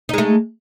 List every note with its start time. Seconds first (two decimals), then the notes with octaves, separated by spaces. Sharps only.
0.09 D#4
0.14 G#3
0.18 A3